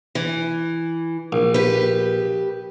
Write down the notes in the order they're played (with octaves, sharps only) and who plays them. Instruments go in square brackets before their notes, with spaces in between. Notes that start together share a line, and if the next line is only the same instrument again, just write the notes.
[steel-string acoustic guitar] E3
[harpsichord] A#1
[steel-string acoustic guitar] G4 B4